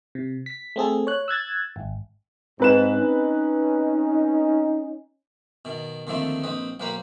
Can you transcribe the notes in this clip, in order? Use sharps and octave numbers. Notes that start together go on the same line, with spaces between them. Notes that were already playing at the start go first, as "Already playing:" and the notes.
C3
B6
A3 C4 G#4 A4
C#5 F#6
E6 F#6 G#6 A6
G#1
G#2 C4 B4 E7
C#4 D#4
B2 D#3
D#2 D3 D#3 F3 A3 C4
A#1 C4 B4 D#5
B1 A#3 B4 C5 A#5 B5